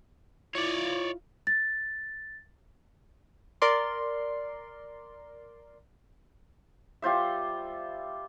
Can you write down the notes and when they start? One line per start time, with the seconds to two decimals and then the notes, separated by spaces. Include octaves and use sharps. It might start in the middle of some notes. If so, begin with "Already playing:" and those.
0.55 E4 F4 C#5 D5
1.47 A6
3.62 A#4 D5 C6
7.02 G3 F4 C5 E5